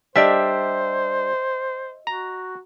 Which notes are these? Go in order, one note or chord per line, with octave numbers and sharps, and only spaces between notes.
G3 D4 G4 C5 D#5 E5
F#4 A#5